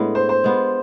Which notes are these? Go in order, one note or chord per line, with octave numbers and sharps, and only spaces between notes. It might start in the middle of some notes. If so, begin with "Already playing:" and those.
Already playing: A2 G#3 B3 D4
C5
C5
G#3 B3 F4